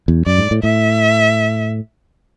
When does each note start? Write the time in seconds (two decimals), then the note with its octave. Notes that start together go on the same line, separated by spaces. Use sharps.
0.08 E2
0.26 F#2 D5
0.38 G#2
0.51 A2
0.63 A2 E5